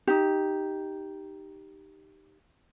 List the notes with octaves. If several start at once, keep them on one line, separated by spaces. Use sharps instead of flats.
D#4 G4